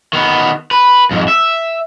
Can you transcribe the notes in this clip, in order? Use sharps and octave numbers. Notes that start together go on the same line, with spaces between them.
D#3 B3
B4
F2 G#2
E5